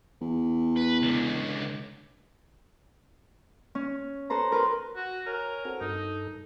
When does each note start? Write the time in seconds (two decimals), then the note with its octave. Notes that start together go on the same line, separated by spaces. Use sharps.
0.21 E2
0.76 B4
1.02 C#2 D3
3.75 C#4
4.30 A4 B4 C5 A#5
4.52 A#4 B4 C6
4.96 F#4
5.27 A#4 C#5 G#5 A#5
5.65 C4 F#4 A4
5.81 G2 D#4 A4